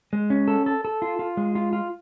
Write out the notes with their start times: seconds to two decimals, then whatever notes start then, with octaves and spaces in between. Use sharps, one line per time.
0.13 G#3
0.30 C#4
0.48 A4
0.66 A4
0.85 A4
1.02 F4
1.19 F4
1.37 G#3
1.55 F4
1.73 F4